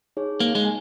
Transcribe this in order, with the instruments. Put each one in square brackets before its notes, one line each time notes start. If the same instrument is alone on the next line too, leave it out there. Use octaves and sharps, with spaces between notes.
[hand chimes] D#4 G#4 C#5
[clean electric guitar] A#3 [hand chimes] D#4
[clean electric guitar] G#3
[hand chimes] G#5